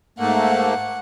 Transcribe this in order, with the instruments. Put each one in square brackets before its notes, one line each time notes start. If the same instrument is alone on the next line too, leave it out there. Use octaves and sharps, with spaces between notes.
[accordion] G#2 A3 A#3 [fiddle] F#5